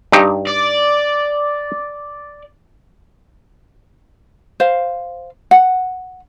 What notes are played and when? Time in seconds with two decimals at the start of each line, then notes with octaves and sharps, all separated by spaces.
0.12 G2 D#4 G4
0.47 D5
4.60 C5 F5
5.51 F#5